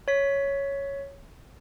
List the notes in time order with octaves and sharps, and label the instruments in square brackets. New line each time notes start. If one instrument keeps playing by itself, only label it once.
[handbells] C#5 B6